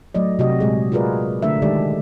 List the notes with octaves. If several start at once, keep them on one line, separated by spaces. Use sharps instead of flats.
F#3 A3 D5 D#5
C3 F#4 G4 D#5
A#2 G#3 G#4
F4 F#4 G#4 A#4 B4 D5
D3 A3 D4 A#4 E5
D#3 G#3 G4 A4 D5